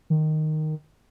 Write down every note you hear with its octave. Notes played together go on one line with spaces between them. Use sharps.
D#3